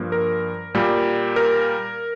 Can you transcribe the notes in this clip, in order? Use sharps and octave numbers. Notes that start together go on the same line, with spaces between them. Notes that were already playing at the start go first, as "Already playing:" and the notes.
Already playing: G2 F3 A#3
A#4
A#2 G3 A#3
A#4